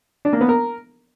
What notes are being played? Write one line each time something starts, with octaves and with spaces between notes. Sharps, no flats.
D4
A#3
B3
A#4